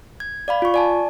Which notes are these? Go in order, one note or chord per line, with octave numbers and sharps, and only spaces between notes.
G#6
D5 F5 B5
F4 C#6
D5 G#5 A5